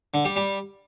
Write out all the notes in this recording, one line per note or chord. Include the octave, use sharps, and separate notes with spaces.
D3
G3
G3